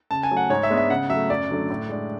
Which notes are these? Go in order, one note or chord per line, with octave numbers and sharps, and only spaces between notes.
C#3 A5
G#5
F#3 A3
F#5
G#2 C#5
E5
G#3 B3 D4
E5
C#3 F#5
F#3 A3 E5
F#2 D5
D3 F#3 A3 D4
A2
G#3 D4